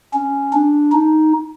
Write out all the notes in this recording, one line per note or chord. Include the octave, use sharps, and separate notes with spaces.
C#4
D4
D#4